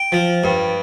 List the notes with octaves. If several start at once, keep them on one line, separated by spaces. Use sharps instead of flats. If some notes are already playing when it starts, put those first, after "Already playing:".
Already playing: G5
F3
G2